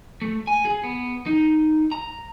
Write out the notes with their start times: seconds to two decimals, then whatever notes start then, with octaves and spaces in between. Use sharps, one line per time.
0.22 A3
0.47 G#5
0.65 G#4
0.84 B3
1.26 D#4
1.92 A#5